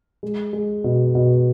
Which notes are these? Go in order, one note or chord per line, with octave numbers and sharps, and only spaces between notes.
G#3
G#3
B2
B2